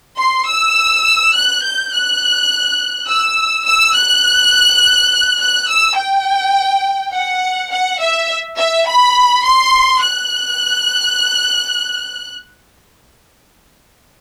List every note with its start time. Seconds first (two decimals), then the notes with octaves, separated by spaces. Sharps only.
0.18 C6
0.47 E6
1.34 F#6
1.64 G6
1.93 F#6
3.08 E6
3.65 E6
3.95 F#6
5.40 F#6
5.68 E6
5.97 G5
7.13 F#5
7.71 F#5
8.00 E5
8.57 E5
8.87 B5
9.44 C6
10.02 F#6